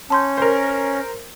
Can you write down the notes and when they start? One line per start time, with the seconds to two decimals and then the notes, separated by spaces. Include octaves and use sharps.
0.10 C#4 A5 C6 G6
0.38 A#4 C5